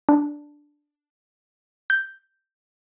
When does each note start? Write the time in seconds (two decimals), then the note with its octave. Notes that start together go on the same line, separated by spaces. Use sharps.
0.09 D4
1.90 G6